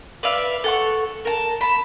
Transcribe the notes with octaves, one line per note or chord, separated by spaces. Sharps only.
B4 D5 E5 F5
A4 F#5 C#6
A#4 A5
A5 B5